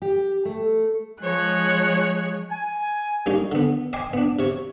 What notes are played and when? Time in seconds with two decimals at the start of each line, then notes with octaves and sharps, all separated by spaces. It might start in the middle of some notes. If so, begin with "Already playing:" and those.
0.02 G4
0.45 A3
1.20 F3 G#3 G#4 C#5 F#6
2.50 G#5
3.26 G3 A#3 C#4 D#4
3.52 D3 B3
3.93 D#5 G5 G#5 C6 D6
4.13 B3 D4
4.39 C3 C#5